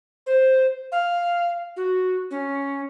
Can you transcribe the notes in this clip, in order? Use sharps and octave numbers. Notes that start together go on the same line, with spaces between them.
C5
F5
F#4
C#4